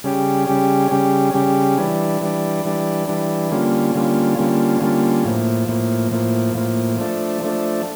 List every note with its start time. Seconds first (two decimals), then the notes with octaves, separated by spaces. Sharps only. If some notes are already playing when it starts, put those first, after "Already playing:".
0.04 C#3 G3 C#4 G4
0.47 C#3 G3 C#4 G4
0.91 C#3 G3 C#4 G4
1.34 C#3 G3 C#4 G4
1.78 E3 G3 D4
2.21 E3 G3 D4
2.65 E3 G3 D4
3.08 E3 G3 D4
3.52 D3 G3 A#3 C#4 F4
3.95 D3 G3 A#3 C#4 F4
4.38 D3 G3 A#3 C#4 F4
4.81 D3 G3 A#3 C#4 F4
5.25 A2 F3 A#3
5.68 A2 F3 A#3
6.12 A2 F3 A#3
6.55 A2 F3 A#3
6.98 F3 A3 D4
7.42 F3 A3 D4